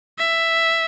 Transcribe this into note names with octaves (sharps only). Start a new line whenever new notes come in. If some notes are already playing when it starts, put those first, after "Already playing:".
E5